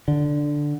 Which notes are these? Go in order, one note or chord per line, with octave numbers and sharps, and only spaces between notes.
D3